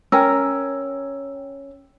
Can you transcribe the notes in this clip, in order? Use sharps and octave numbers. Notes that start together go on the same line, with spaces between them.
C#4 A#4 G5 E6